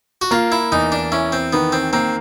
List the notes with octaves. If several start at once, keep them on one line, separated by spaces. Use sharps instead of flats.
F#4
A#3 F4
E4
E2 D#4
D4
C#4 E4
C4
D#3 B3
C4
A#3 C4